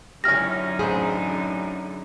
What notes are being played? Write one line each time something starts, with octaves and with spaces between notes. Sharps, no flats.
F#2 D3 C#4 D#4 E4 G4 F6 A#6
A1 G#4 C5